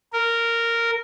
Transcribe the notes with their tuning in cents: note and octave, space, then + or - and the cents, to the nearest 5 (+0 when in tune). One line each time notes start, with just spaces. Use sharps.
A#4 -10